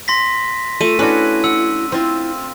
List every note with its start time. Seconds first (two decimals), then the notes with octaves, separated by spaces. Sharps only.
0.08 C6 A#6 B6
0.81 A3 F4 D#7
0.99 C#4 D4 E4 F#4 B4
1.44 F#5 E6
1.92 C4 E4 F4